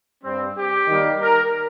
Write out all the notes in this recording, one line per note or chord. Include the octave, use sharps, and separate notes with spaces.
G2 G3 C4
G4
D#3 G3 A#3
A#4